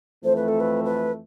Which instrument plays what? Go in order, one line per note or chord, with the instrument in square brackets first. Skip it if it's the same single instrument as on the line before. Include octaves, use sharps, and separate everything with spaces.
[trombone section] F2 E3 A3 [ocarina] C5
[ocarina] B4
A4
B4
B4